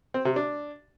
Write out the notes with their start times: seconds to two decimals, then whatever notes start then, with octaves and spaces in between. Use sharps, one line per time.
0.14 C4
0.25 C3
0.36 D4